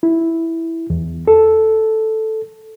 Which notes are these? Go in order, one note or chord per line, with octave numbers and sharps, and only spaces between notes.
E4
E2
A4